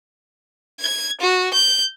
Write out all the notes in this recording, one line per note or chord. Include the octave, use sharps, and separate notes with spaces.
G#6
F#4
G6